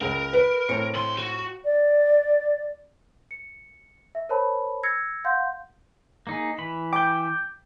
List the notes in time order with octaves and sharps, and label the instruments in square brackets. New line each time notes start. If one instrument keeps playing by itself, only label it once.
[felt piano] C#2 [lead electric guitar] A#4
[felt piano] B4
A2 C4 C#7
[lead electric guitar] D2 C6
F#4
[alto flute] D5
[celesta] C#7
E5
A#4 C5 C#5 A5 B5
E6 G#6 A#6 C7 C#7
F5 F#5 C6 G6
[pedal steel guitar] A#3 D#4 G#4
E3 B5
[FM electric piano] G5 G6 [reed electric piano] D6